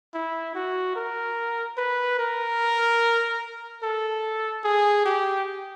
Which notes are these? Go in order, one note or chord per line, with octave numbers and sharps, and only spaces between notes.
E4
F#4
A#4
B4
A#4
A4
G#4
G4